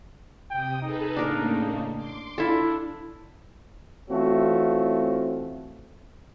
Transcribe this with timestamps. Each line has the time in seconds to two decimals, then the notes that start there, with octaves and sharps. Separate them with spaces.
0.50 C3 G5 D#6
0.82 D#4 G#4 A4 B4
1.17 A2 C#3 A#3 D4 A#4
1.97 C6 D6
2.38 D4 E4 F4 A4
4.10 E3 A3 C4 C#4 F4 F#4